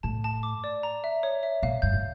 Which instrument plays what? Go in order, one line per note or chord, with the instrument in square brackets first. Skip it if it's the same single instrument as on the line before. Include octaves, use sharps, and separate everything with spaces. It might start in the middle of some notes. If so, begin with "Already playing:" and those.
[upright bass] A2 [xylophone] A5
[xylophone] A5
D6
D5
A#5
E5
C#5
E5
[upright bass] A#2 [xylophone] F5
[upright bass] G2 [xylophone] G6
[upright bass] A2